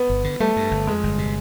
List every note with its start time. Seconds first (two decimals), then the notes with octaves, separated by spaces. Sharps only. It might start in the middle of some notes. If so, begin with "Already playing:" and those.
Already playing: B3
0.10 G1
0.24 D3
0.40 G3 A3
0.56 G2
0.71 G1
0.87 F2 G#3
1.03 G1
1.18 C3